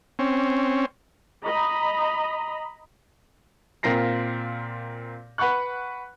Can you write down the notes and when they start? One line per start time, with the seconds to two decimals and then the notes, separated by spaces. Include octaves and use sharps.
0.19 C4 C#4
1.44 D#5 A#5 B5
3.83 A#2 C4 F4 A#4 A#6 C7
5.38 B4 F#5 B5 C#6 F#6